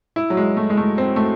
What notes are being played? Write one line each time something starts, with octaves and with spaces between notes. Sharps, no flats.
E4
F#3
G#3
A3
G#3
A3
C4
A3